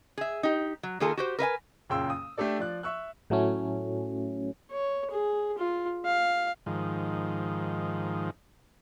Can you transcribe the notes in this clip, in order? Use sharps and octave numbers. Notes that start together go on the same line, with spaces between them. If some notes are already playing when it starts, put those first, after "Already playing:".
G#4 E5
D#4 G4
F#3
D#3 A#3 F4 G#4 A4
F#4 G4 C5
A#4 B4 E5 G#5
F#1 A#2 C#3 G5 C6 E6
D#6
A3 D4 G4 A4 D5
F3 D5 F#6
E5 C#6 E6 F#6
A2 F#3 A3 C#4
C#5
G#4
F4
F5
G#2 D#3 F3